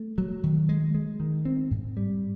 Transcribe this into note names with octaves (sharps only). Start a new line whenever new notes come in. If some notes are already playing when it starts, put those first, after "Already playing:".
Already playing: A3
F#3
D#3
G#3
G#3
D#3
C4
G#2
G3